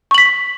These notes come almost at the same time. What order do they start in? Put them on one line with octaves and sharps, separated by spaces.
C#6 F#7 B6